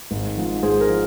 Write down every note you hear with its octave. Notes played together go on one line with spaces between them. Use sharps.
G#1
G#2 F3
G#1 G#4 C5
A#4
F3